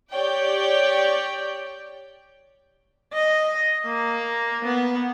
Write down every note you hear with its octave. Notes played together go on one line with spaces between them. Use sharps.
G4 C#5 D5 G5
D#5
A#3
B3